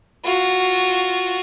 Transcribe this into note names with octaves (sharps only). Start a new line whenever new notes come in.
F4 F#4